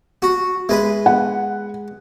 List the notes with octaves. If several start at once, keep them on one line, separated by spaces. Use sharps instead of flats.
F#4
G#3 B4 E5
F#5